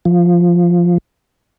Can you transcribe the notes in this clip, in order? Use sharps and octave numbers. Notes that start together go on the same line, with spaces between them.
F3